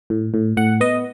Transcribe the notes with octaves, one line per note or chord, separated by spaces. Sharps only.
A2
A2
A2 F#5
B3 D#5